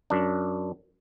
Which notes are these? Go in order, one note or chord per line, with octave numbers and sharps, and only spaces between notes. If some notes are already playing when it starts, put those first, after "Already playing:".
F#2 D4